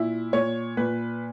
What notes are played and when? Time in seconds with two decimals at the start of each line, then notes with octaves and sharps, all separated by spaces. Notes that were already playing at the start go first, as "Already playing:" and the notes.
Already playing: A#2 E4
0.33 A#2 C#5
0.77 A#2 B4